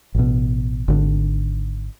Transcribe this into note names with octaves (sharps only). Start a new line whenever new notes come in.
A1 B2
G#1 D3